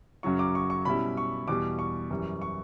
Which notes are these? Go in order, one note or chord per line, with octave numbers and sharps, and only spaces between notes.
F#2 C#3 F#3 C#6
D6
C#6
C#6
B2 G3 C#4 E4 B5
C#6
E2 B2 G3 D6
C#6
F#2 E3 G3
C#6